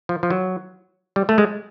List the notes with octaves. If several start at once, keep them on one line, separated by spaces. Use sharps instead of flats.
F3
F3
F#3
G3
A3
G#3